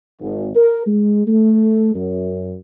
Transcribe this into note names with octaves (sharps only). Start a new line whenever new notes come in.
G#1
A#4
G#3
A3
F#2